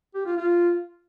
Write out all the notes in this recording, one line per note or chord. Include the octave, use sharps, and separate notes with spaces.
G4
F4
F4